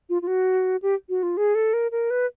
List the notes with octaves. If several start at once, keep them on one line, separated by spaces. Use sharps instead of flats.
F4
F4
F#4
G4
F#4
F4
G#4
A4
A#4
A#4
B4